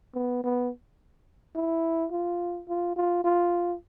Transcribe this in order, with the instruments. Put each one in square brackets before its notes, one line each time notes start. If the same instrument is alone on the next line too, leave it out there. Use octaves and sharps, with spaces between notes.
[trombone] B3
B3
E4
F4
F4
F4
F4